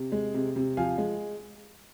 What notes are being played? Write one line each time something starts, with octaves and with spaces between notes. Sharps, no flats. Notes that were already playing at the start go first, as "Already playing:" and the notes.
Already playing: C3
G#3
C3
C3
F3 F5 G#5
G#3